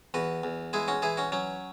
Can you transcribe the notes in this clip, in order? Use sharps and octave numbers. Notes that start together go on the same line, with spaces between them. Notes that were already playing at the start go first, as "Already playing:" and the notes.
E2 F#4 B4
E2
G#3 E4 G#4
C#4 F#4
E3 E4 G#4
C#4 F#4
F#3 C#4